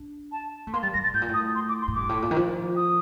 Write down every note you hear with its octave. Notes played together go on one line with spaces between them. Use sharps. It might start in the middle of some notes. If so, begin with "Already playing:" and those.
Already playing: D4
A5
A3
A#3 C6
G3 A6
G3 A#6
A#2 A6
A2 G6
A#2
A2
D#6
C6
D6
C6
A2
G2 D6
A2
A#2
D#3
F3
D#6